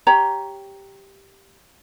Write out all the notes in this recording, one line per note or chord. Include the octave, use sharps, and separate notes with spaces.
G4 C#5 A#5